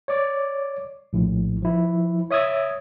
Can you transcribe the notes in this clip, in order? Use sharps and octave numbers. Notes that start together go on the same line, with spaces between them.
C#5 D5 D6
A#1 A2
F3 E4
C#5 E5 D#6 E6 G#6